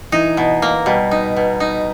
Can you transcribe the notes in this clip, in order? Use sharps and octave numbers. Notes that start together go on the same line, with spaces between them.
E3 D#4
B2
A#3
B2 G3
D#4
B2
D#4